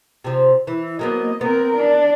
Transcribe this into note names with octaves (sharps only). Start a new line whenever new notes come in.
C3 F3
E3
F#3 A#3 B3 D#5
B3 C4 A#4
D4